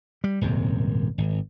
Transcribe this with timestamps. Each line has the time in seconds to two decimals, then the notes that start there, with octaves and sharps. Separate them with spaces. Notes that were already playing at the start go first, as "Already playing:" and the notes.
0.24 G3
0.41 D#1 G#1 F#2 C3
1.18 G#1